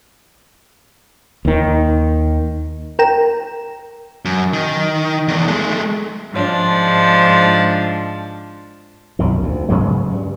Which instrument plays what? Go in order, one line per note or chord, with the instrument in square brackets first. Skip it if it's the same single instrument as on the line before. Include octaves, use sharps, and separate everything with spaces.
[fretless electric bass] D#2 D#3
[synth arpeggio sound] A#4 G5 A#5 E7
[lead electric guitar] F#2
D#3
E2 D#3
G#3 A3
[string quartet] G#2 F3 D4
[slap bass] B1 F#2 D#3
D2
G#2 C#3 F#3 G#3
G2